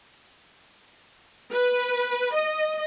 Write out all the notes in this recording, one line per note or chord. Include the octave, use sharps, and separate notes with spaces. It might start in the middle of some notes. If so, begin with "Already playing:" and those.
B4
D#5